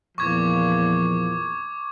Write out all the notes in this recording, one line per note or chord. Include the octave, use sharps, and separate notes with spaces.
E2 A#2 F3 C#6 D6 G#6